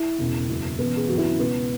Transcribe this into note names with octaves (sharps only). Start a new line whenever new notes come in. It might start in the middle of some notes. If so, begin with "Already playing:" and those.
Already playing: E4
E1 E2 C#3
F#1 E2 B2
E1 E2 C#3 E3 B3
G#4
G#1 F#2 C#3 E3 F#4
E4
C#4
C#2 B2 B3